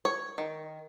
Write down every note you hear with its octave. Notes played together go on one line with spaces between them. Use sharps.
C#5
D#3